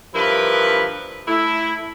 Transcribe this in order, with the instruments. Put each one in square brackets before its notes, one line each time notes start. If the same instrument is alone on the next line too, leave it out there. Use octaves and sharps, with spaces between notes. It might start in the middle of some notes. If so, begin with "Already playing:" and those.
[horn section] G2 F3 E4 A#4 B4
A3 E4